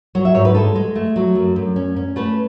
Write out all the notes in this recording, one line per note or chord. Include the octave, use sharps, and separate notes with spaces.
F#3 C#5
E5
G#2 C#5
B4
G#3 A4
G#3
A3
F#3
F#2
F#2
C#4
C#4
A3 B4